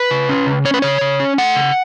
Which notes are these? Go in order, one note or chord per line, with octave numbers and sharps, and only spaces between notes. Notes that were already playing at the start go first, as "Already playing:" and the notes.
Already playing: B4
C#3
C#4
C#3
C#4 C#5
B4
C#3 C#5
C#3
C#4
A3 F#5
C#3